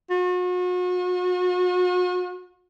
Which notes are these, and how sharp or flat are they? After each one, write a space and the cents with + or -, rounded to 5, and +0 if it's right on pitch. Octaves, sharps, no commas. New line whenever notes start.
F#4 -40